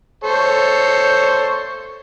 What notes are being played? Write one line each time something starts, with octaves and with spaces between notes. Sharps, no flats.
A4 C5 C#5